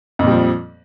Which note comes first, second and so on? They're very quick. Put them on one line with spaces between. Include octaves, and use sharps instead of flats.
F2 A#2 G3 F3